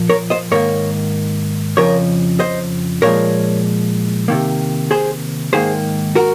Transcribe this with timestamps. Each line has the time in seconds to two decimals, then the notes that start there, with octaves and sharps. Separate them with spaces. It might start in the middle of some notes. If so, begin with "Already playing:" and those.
Already playing: A#2 F3 A#3
0.09 A#4 C#5
0.30 C5 D#5
0.51 G#2 D#3 A#3 A#4 C#5
1.77 F2 C#3 F3 A#4 C#5
2.40 C5 D#5
3.02 A#2 F3 G#3 A#4 C#5
4.28 C3 D#3 A#3
4.91 G#4 C5
5.53 G#2 D#3 A#3 G#4 C5
6.15 F#4 A#4